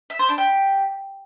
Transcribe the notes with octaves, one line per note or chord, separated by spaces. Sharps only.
E5
C5
D4
G4